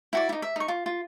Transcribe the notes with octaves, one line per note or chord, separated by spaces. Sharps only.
E4 F#4 D5
D#4 E4
E5
D#4 C#6
F4
F4